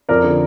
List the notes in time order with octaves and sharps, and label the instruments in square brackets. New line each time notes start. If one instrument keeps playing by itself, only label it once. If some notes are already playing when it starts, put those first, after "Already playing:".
[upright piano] F2 A#4 D5
D3